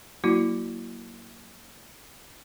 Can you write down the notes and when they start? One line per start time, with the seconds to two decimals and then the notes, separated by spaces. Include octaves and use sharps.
0.24 F#3 A#3 E4 F#4